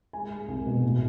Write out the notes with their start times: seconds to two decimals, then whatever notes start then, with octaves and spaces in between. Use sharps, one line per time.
0.13 G#3 G#5
0.31 G#3
0.48 C2
0.66 B2
0.83 A2